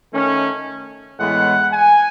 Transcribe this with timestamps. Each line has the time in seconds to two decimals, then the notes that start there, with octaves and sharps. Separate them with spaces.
0.13 D#3 A3 C#4
1.19 A2 E3 G#3 B3 F#5
1.72 G#5